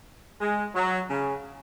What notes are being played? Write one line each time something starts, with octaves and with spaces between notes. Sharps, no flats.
G#3
F#3
C#3